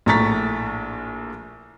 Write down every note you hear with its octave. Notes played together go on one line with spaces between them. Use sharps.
A#1 A2 A#5 C#6 A6 B6